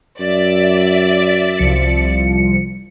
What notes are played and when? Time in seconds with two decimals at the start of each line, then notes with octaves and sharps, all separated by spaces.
0.20 F#2 D5 E5
1.58 C2 F3 C#7